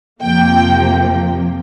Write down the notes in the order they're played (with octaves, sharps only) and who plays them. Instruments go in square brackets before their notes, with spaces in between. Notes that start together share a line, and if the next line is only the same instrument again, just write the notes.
[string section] F2 C3 F3 A#3 G5